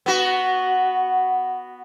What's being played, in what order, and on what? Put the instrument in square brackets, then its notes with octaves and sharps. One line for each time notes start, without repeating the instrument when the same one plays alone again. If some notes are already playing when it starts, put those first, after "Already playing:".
[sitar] B3 F#4